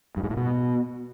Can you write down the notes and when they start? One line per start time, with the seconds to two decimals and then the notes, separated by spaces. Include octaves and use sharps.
0.17 G2
0.23 G#2
0.30 A2
0.37 B2